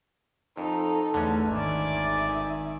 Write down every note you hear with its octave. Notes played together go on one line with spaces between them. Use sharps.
F2 D#4 A4
E2 D3 A3 C#4
G#1 D#3 D5 E5 G#5